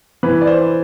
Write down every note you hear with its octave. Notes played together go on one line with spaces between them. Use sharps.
E3 B4
D5
C5